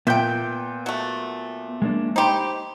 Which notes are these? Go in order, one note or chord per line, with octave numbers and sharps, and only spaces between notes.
A#2 B3 E5 G5 G6
F#3 A3
G#3 A#3 D4
D#4 G4 C5 B5 C6